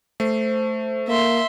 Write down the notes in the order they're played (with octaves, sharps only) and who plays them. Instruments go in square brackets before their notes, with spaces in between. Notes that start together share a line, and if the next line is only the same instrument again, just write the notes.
[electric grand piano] A3 [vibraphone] C5
[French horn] A#3 [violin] E5 C6